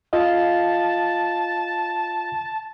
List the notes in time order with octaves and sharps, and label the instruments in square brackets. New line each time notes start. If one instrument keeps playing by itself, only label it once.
[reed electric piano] F4 D#5 F5 [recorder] A5